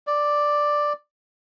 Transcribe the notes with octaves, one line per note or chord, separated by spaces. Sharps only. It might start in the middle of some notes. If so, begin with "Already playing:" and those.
D5